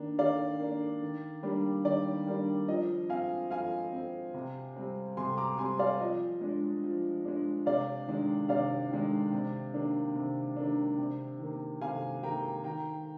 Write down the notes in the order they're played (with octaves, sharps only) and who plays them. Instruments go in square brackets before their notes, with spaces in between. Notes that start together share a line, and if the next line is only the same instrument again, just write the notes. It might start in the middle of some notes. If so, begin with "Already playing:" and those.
Already playing: [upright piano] D#3 A#3 D4
D#3 D5 F5
A#3 D4
D#3
G3 A#3 D4
D#3 D5
G3 A#3 D4
F3 D#5
C4 F5 G#5
F3 F5 G#5
C4
C3
G3 C4
C3 G#5 C6
A#5 D6
G3 C4 G#5 C6
D5 F5
F3 D#5
G#3 D4
F3
G#3 D4
C3 D5 F5
D#3 G#3 D4
C3 D5 F5
D#3 G#3 D4
C3
D#3 A#3 D4
C3
D#3 A#3 D4
C3
D#3 A#3
C3 F5 G#5
D#3 A#3 G5 A#5
D#3 G5 A#5